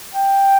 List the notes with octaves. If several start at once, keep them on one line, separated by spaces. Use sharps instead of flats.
G5